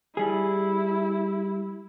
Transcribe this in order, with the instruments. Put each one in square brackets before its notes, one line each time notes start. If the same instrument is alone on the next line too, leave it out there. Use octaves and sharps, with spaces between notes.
[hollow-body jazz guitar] G3 G#4 [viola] E4